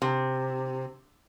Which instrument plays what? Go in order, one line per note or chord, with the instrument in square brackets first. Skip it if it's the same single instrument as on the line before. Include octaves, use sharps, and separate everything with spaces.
[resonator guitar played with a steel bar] C3